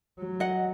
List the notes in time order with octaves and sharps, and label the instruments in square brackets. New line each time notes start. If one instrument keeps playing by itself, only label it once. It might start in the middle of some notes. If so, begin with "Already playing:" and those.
[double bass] F#3
[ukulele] D#5 F#5